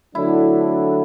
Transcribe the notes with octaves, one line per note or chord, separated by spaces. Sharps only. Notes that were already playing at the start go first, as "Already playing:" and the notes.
D3 F#3 A3 D4 E4